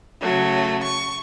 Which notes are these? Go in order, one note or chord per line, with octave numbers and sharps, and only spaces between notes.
C#3 F#3 A3
C#6